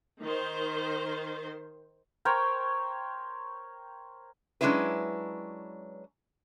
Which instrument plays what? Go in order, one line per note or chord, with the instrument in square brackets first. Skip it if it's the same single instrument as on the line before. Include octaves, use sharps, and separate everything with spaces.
[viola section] D#3 C5
[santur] A#4 C5 C#5 G5
[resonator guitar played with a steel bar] F#3 G#3 C#4 D4 E4 B4